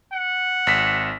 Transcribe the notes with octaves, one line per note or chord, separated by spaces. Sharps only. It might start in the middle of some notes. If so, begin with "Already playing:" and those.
F#5
G#1 B6